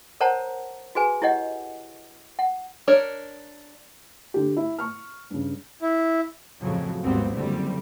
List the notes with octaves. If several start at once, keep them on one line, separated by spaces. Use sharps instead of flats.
A#4 C5 C#5 F#5 A5 A#5
F#4 G#4 B4 G#5
E4 G4 C#5 D#5 F#5
F#5
D4 A#4 C#5
D3 G4
E4
C#6 F6
G2 C#3
E4
F2 A2 C#3 F3 F#3
G#1 D#2 G3 B3 C4
F#1 F#2 D3 G3 A3 C4